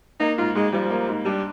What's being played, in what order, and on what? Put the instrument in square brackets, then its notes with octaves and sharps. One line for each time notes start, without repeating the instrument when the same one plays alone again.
[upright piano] A#3 [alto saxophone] D#4
[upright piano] G#2 [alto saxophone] F4
[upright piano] G#2 [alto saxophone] G#3
[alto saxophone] F3 [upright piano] G3
[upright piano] A#3
G#2
[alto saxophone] G3 [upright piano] D4